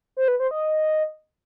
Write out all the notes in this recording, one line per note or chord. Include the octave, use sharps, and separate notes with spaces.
C5
B4
C5
D#5